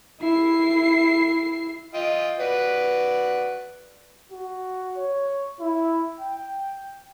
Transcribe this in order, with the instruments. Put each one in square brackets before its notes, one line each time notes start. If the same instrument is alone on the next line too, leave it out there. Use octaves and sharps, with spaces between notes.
[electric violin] E4 C7
[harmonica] F4 D#5 G5
F#4 B4 D5
[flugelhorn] F#4
C#5
E4
G5